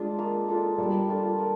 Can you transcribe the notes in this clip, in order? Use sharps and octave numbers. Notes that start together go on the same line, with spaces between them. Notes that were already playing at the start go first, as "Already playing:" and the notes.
Already playing: G#3 D4 F4
A#3
D4 F4 A4
G3 A#3
D4 F4 A4
A#3